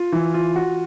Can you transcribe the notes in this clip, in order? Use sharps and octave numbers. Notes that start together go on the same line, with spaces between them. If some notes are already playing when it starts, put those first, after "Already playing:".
Already playing: F4
E3
F4
F#4